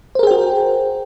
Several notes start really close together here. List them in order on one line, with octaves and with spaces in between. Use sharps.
C5 A#4 G#4 G5 F#4